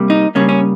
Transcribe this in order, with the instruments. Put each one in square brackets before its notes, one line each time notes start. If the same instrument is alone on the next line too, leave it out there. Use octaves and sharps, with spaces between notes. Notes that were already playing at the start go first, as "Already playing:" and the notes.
Already playing: [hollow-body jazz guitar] C3 G3 A#3
D#4
C#3 G3 A#3 C#4
C#4